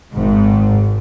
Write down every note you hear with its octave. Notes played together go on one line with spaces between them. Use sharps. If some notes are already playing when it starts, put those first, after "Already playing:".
G#1 G#2